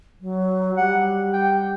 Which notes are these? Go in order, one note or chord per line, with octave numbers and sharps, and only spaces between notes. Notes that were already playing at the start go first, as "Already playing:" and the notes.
F#3
G3 F#5
G5